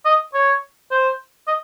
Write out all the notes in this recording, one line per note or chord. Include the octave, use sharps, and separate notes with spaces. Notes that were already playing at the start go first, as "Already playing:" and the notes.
D#5
C#5
C5
D#5